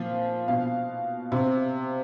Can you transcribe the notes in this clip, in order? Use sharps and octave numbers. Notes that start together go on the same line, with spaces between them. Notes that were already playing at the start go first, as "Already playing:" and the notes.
Already playing: A#2 F3 F5
B2 F5
C3